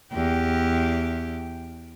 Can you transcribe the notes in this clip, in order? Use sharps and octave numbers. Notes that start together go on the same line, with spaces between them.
E2 G4